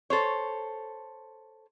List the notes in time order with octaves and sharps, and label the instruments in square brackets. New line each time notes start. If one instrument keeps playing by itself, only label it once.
[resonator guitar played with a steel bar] A4 C5 C#5